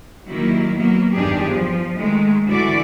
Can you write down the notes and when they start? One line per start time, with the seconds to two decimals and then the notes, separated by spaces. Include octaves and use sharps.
0.27 D#3 F#3 G3 A#3 E4
0.75 F#3 A#3 B3
1.14 E2 G2 D#3 D4 G4 G#4
1.50 F3
1.97 D#3 G#3 A3
2.48 D3 E3 E4 F#4 D5